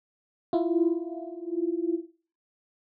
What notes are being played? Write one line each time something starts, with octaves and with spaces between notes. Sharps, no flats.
E4 F4